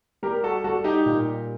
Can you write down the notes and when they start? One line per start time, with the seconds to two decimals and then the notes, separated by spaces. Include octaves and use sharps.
0.23 G3 G4 A#4
0.44 F#4 A4
0.64 G3 F#4 A4
0.84 D#4 G4
1.06 A#2